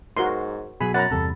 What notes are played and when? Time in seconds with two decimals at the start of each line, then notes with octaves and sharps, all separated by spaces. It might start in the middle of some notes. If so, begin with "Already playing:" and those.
0.17 G#2 F#4 A#4 C6
0.81 B2 F#3 G#4 B5
0.94 F#2 F#5 A#5 B5 A6
1.11 E2 G2 C3 A4